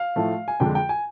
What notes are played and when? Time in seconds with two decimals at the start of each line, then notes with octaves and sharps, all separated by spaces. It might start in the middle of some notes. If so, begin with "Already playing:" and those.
Already playing: F5
0.16 A2 F3 A3
0.48 G#5
0.60 F2 D3 F3 G#3 G5
0.75 G5
0.89 G#5